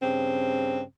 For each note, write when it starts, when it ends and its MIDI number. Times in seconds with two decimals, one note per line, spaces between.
0.03 0.82 43
0.03 0.82 49
0.03 0.82 60